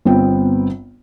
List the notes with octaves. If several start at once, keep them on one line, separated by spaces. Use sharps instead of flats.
G1 B3 C4 F4 G5